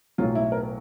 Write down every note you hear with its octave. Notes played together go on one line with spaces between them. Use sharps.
B1 A2 F#3 F4
E4
A#4